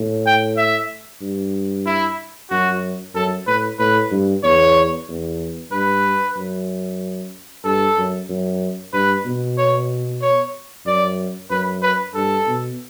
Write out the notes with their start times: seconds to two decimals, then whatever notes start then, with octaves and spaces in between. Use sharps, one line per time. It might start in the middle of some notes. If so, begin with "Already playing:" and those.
Already playing: A2
0.26 G5
0.57 E5
1.22 G2
1.86 E4
2.50 F#2 F#4
3.15 F#2 A4
3.47 A2 B4
3.79 A2 B4
4.11 G2
4.43 E2 C#5
5.08 E2
5.72 G2 B4
6.36 F#2
7.65 G2 A4
7.97 F#2
8.29 F#2
8.93 G2 B4
9.25 B2
9.58 C#5
10.22 C#5
10.86 F#2 D5
11.50 F#2 B4
11.82 B4
12.15 G2 A4
12.47 B2